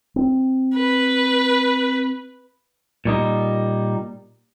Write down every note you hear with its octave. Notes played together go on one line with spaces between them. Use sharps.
C4
B4
A#2 G3 D#4